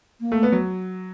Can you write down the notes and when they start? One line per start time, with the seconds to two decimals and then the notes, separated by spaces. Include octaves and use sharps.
0.21 A#3
0.32 A3
0.43 B3
0.52 F#3